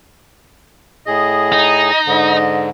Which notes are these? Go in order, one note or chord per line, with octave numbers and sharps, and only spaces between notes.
A2 G#4 D#5
D#4
G#2 D3